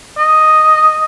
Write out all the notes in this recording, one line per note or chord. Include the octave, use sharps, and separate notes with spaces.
D#5